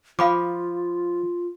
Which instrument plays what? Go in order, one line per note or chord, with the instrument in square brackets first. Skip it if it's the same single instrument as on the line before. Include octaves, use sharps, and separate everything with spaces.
[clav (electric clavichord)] F3 [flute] F4 [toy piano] F5 B5 D6